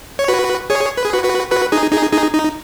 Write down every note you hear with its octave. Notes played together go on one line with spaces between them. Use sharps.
C#5
F#4 B4
G#4 C#5
B4
G#4
F#4 B4
F#4 B4
F#4 B4
D#4 G#4
D#4 G#4
D#4 G#4
D#4